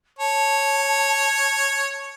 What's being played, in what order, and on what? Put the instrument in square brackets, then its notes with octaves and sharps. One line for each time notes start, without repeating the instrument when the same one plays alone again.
[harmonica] C#5 [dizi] A5